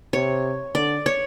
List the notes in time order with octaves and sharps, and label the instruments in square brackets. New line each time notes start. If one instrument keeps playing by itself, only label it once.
[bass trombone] C3 [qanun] C#5
[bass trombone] D3 [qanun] D5
[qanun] C#5